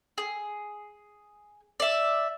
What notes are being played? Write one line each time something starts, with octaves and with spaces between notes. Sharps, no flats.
G#4
D5 E5